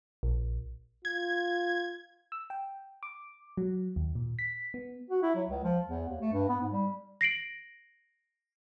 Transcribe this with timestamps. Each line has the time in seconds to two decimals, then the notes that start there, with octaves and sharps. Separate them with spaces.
0.23 A#1
1.05 F4 G#6
2.32 E6
2.50 G5
3.03 D6
3.57 F#3
3.96 D#2
4.15 A#2
4.39 B6
4.74 B3
5.10 F#4
5.23 E4
5.35 F#3
5.49 C#2
5.64 F3
5.87 E2
6.08 D#2
6.21 A3
6.33 G2
6.49 B3
6.61 G#2
6.72 G3
7.21 A#6 C7 D7 F#7